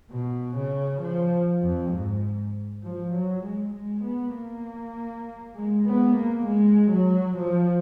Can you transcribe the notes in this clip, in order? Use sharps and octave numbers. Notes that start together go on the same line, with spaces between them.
B2
C#3
F3
F2
G#2
F3
F#3
G#3
G#3
B3
A#3
G#3
B3
A#3
G#3
F#3
F3